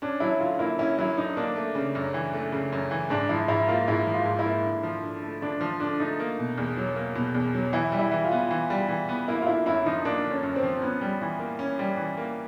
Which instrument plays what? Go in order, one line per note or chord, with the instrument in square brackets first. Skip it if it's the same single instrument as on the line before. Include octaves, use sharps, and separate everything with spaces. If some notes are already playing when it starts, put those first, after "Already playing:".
[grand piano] C#4 [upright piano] D4
[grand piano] F#3 [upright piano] E4
[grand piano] D3 [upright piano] F4
[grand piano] A#3 [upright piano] E4
[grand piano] C#4 [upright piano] E4
[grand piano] F#3 [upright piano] E4
[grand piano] D3 [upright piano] D#4
[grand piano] A#3 [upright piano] D4
[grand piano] A3
C#3
F#2
E3
A3
C#3
F#2
E3
[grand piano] G#2 [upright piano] D4
[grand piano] F3 [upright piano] E4
[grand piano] G#2 [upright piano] E4
[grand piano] A#3 [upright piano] F4
[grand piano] G#2 [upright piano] E4
[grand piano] F3
[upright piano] F4
[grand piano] G#2
[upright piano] E4
[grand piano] A#3
D3
F3
D3
A3
[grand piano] D3 [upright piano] D4
[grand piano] F3
[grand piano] D3 [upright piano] D4
[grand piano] A3 [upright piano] D#4
[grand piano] A#3
B2
E2
F#3
A#3
B2
E2
F#3
[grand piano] E3 [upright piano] E4
[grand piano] G3
[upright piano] E4
[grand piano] E3
[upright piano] F4
[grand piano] B3
E3
G3
E3
B3
[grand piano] A#3 [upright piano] E4
[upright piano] F4
[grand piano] D3 [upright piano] E4
[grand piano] F#2 [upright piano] E4
[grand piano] F3 [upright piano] D#4
[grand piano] A#3 [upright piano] D4
[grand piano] D3
[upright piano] C#4
[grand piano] F#2
[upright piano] C4
[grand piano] F3
[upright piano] B3 [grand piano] C#4
[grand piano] G3
E3
A#3
C#4
G3
E3
A#3